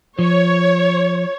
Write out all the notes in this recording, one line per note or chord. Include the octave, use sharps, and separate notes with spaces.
F3 C#5